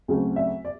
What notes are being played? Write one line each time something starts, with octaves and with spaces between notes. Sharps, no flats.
D2 C#3 F#3 A3 C4
E5
D5